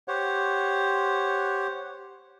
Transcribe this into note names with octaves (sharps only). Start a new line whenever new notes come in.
G4 C5 C#5 F#5